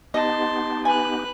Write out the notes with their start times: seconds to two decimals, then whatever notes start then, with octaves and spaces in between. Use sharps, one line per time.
0.14 B3 D#4 G4 D#5 A5 C6
0.85 B4 G#5 F#6